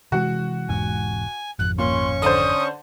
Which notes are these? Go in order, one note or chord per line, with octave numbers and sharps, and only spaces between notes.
C3 E3 G#3 F#4
E1 E2 G#2 G#5
G#1 F2 F#6
A#2 C#4 C6 C#6
D3 D4 C5 D#6